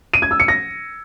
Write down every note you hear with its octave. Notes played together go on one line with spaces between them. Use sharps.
D#7
G#6
E6
C#7
A#6